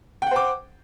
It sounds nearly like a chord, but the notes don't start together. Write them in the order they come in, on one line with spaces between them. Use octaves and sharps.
G5 F#5 C5 D6